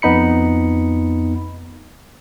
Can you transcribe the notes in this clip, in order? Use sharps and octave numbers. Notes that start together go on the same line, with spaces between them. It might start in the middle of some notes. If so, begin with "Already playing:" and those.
F2 B3 D#4 B5 C#7